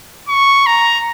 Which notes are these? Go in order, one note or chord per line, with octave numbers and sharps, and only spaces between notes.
C#6
A#5